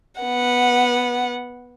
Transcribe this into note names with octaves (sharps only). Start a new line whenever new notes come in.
B3 F#5